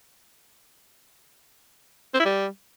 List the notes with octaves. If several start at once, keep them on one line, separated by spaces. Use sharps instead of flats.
C4
E4
G3